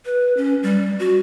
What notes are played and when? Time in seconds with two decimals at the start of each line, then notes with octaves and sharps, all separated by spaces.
0.05 B4
0.37 C#4
0.63 G3
0.99 F#4